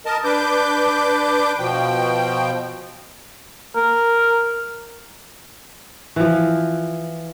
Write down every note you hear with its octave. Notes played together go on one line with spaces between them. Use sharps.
A#4 D#5 A5
D4 B4 D6 G6
B2 F3 G5
A#4
E3 F3